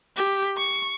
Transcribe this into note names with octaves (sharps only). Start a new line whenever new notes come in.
G4
C#6